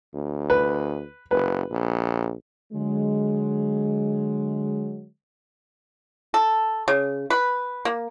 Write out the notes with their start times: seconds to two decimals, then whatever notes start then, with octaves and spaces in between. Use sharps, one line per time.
0.14 D2
0.50 B4
1.31 F#1 B4
1.71 A#1
2.72 D3 F#3 G#3
6.34 A4
6.88 C#3
7.30 B4
7.85 A#3